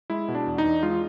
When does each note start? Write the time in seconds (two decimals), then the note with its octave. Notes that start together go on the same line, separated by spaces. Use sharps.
0.10 G#3 E4
0.28 B2
0.35 D4
0.46 E2
0.58 D#4
0.64 E2
0.83 G#3 F4